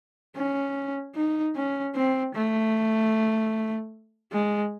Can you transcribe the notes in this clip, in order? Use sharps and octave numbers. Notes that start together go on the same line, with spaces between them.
C#4
D#4
C#4
C4
A3
G#3